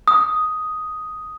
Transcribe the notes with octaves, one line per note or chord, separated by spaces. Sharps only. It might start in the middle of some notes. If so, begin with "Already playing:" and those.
D#6